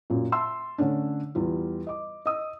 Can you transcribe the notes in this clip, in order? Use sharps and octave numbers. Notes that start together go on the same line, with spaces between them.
F#2 A#2
E5 A5 C6 E6
D3 A3 C#4 D4
E2 G3 F4
D#5 D6
D#5 D#6 E6